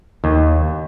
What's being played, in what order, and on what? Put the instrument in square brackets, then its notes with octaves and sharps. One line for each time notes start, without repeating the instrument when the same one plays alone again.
[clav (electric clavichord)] D#2